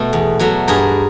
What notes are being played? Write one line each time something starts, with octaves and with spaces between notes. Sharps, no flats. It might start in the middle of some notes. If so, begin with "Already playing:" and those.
Already playing: B2 A3 A4
E2
B2 F#3 A3
G2 G#4 A#4